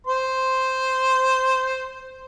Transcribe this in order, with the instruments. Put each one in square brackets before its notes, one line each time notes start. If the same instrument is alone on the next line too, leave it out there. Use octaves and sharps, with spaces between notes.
[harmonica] C5 C6